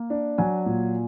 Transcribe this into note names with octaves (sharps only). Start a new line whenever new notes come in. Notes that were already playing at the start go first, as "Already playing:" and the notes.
Already playing: A#3
D4
F#3 G#5
A#2